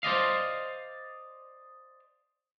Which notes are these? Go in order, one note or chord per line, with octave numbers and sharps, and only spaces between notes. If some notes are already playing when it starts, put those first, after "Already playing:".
C5 D5 D#5 F5